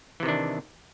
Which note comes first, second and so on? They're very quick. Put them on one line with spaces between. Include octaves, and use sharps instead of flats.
E3 C3 D#3 D4